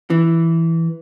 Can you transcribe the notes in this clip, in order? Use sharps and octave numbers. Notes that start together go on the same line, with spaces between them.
E3